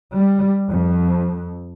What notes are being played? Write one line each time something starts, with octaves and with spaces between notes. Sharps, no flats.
G3
F2